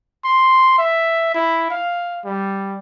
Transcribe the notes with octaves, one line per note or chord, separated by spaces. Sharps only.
C6
E5
E4
F5
G3